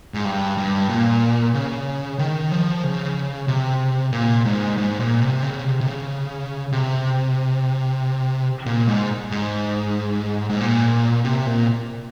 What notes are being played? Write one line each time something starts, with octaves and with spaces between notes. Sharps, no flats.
G#2
G2
G2
A#2
C#3
D#3
F3
C#3
C3
A#2
G#2
G#2
A#2
C3
C#3
C3
C3
C#3
C3
A#2
G#2
G#2
G#2
A#2
C3
A#2